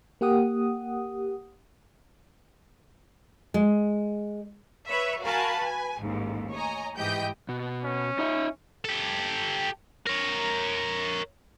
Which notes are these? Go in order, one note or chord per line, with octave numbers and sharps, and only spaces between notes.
A#3 G4 F#5 D#6
G#3
B4 C#5 E5
F#4 A#4 F5 G#5 A5 B5
B4 G#5
A1 D#2 G#2
C#5 D#5 G#5 A#5
G#2 E3 G4 D#5 G5 G6
B2
C#4
D#4 D#5 E5
G4 A4
A#4 C#5